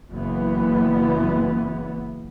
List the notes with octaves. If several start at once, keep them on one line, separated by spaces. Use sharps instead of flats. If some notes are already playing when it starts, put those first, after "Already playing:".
F#1 E3 B3